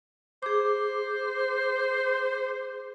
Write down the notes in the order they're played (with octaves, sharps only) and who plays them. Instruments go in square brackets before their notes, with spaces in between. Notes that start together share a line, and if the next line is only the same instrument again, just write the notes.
[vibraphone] G#4 D6 [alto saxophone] C5